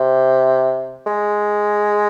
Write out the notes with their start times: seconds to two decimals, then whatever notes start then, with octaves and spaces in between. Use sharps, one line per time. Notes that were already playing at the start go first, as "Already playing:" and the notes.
Already playing: C3
1.07 G#3